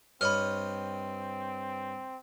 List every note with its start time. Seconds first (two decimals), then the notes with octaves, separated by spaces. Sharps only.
0.21 G2 C4 C#5 D#5 B5 F6